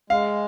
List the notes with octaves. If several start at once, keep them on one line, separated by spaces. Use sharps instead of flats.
G#3 F5